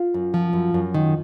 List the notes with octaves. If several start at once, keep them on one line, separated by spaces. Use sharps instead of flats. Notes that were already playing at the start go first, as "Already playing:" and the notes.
Already playing: F4
F#2
F3
F#2
F#2
D#3